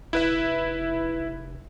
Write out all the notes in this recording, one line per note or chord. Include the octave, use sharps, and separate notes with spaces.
F1 E4 B4 E5